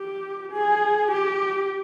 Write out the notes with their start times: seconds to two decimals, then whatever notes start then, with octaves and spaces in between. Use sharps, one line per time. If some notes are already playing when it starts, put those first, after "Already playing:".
Already playing: G4
0.52 G#4
1.11 G4